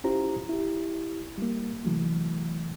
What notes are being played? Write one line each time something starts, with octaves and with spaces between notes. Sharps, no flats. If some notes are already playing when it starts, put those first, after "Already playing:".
C#4 E4 F4 G4 C5 A#5
E4 G4
G3 A#3
C3 E3 F#3 A3